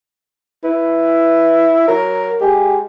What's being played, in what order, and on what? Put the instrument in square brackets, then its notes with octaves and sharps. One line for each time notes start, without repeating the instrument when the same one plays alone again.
[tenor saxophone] E4 [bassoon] B4
[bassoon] F#3 [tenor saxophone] A#4
[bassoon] G#3 [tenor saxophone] G4